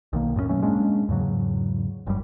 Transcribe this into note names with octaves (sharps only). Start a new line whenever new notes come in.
B1 D#3 A#3
F#2 A2 G#3 C#4
B2 F#3 A3 C#4
G#3 A#3 C#4 D4
E2 G#2 C#3 F#3
G1 F#2 G3